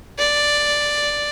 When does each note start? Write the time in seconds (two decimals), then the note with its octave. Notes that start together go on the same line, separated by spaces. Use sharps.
0.19 D5